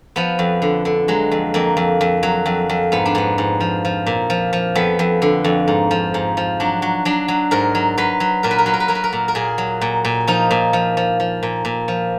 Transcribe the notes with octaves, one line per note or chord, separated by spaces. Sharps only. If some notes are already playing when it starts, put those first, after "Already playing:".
F3 B3
F2
D3
D3
F#3 G#3
F2
F2 A#3
F2
F2
F#3
F2
F2
G#2 B3
D4
G#2 B3
G#2
F3
F3
A#2
F3
F3
F2 B3
F2
D3
F2
G#2
F3
G#2
F3
F#3 D4
F#3
F#3 D4
F#3
G#2 A#4
F#3
F#3 B4
F#3
A#2 A#4
B4
A#4
F#3 B4
A#4
B4
F#3 A#4
B4
A#4
A#2
A#4
A#2 G#4
F#3
A#2
A#2
F3 D#4
A#2
F3
F3
F3
A#2
A#2
F3